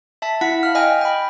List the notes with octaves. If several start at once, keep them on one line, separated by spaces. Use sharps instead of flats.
E5 A5 B6
E4 F#5 B6
F5 F6
D#5 G5 G#5
G5 B5